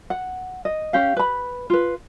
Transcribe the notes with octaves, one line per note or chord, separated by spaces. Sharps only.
F#5
D#5
C#4 G4 F5
B4 B5
F4 B4